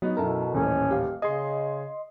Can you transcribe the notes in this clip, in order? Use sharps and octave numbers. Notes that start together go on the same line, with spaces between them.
F#3 B3 D#4 F#4
F#2 B2 E4 A4 A#4 E5
D#1 A1 C#4
G4 F5
C#3 G#4 D#5 C6